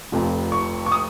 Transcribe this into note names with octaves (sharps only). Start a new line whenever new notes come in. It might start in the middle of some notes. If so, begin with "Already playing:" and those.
F1 F2 C3 F3
C#6
C#6
D#6